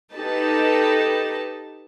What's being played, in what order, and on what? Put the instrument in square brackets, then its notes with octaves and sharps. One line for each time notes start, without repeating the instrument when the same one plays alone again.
[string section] D#4 G4 A4 B4 A5